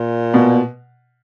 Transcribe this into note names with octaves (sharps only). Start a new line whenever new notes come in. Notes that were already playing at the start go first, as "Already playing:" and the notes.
Already playing: A#2
B2